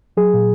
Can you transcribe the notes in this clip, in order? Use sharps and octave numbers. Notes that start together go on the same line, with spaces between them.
F#3 G#4
A#2